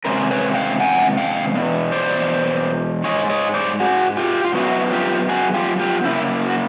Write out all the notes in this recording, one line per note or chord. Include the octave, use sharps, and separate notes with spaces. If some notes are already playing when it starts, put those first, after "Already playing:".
C3 D#3 G#3 C#4 A#4 C5
B4 C#5
F5 G5
F#5 G#5
F5 G5
E2 B2
C5 D5
G#2 E3 G#3 C#5 D#5
C#5 D#5
C5 D5
F#4 G#4
F4 G4
F4
F#2 D#3 F#3 B3 E4 F#4
F4 G4
F#4 G#4
F4 G4
F4 G4
F#2 C#3 A#3 E4
F#4